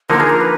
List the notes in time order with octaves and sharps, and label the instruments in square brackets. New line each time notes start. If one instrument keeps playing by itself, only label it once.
[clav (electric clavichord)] D3 F3 A#3 D#4 [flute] A#4
[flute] G#4
A#4
B4